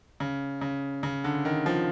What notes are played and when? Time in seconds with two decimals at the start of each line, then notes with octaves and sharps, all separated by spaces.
0.20 C#3
0.61 C#3
1.03 C#3
1.24 D3
1.45 D#3
1.66 F3